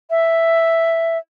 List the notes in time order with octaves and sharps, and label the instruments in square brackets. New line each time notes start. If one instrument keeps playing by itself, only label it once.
[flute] E5